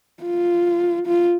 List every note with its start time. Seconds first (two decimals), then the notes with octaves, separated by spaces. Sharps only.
0.23 F4
1.07 F4